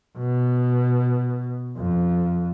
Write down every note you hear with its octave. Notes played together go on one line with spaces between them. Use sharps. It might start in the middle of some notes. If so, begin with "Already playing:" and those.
B2
F2